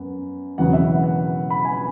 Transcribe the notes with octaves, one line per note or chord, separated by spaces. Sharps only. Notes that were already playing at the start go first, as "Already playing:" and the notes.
Already playing: F#2 B3
E1 E2 C#3 F#3 B3 F#5
E5
F#5
F#5
B5
G#5